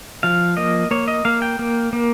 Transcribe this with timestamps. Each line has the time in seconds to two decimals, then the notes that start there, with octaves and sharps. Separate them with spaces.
0.23 F3 F5
0.57 A#3 D#5
0.91 A#3 C#5
1.08 D#5
1.25 A#3 F5
1.42 G5
1.59 A#3
1.93 A#3